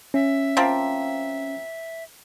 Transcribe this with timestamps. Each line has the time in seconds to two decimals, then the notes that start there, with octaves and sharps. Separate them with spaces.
0.14 C#4 E5
0.57 F3 A#3 C4